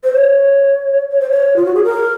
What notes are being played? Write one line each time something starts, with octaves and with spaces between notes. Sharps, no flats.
C5
C#5
C#5
C5
C#5
F4
F#4
G#4
A#4